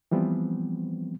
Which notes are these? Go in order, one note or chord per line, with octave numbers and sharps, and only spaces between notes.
E3 F3 G3 B3 C4